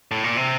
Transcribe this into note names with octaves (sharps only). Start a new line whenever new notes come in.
A2
A#2
C3